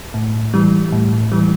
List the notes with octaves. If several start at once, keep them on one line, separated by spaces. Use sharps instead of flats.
A2
E3 G3
A2
E3 G3